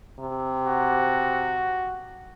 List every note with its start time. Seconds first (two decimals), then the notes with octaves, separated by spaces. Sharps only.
0.20 C3
0.66 F#4